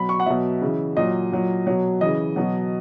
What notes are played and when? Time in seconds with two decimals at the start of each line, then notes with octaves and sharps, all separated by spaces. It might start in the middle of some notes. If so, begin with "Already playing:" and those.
Already playing: B2 F#3 B5
0.09 C#6
0.20 F#5
0.26 B2 F#3 E5
0.61 C#3 E3
0.96 A#2 F#3 D#5
1.32 A#2 F#3
1.67 B2 F#3
2.01 C#3 E3 D#5
2.36 B2 F#3